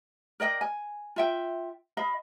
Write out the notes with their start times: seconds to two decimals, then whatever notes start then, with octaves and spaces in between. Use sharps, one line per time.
0.40 A#4 D5 D#5 G5
0.61 G#5
1.16 F4 E5 G5
1.97 D#5 F5 B5